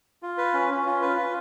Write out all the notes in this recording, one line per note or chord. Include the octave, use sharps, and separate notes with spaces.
F4
B4
C#4
C#4
F4
B4
F4